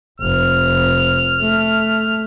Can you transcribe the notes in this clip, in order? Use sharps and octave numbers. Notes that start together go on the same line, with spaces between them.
F1 F6
A3